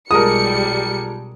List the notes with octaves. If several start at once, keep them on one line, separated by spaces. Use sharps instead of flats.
B1 G3 G#3 F4 A#4 A5 D#6 C#7